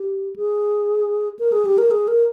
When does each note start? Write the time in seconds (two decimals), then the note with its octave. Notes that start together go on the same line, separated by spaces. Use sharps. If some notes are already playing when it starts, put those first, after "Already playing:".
Already playing: G4
0.36 G#4
1.39 A#4
1.52 G#4
1.65 G4
1.78 A#4
1.91 G#4
2.08 A#4